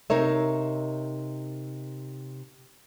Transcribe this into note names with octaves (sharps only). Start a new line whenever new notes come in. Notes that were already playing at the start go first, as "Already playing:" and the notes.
C3 D#4 A#4 C#5 E5